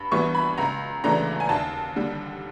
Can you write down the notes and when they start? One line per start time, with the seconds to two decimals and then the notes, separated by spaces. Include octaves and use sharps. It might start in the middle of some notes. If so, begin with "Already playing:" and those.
Already playing: G2 B5
0.12 E3 G3 B3 C#6
0.35 B5
0.58 C#2 A#5
1.04 C#3 E3 A3 D4 A#5
1.40 G#5
1.49 D#2 A5
1.96 D3 G3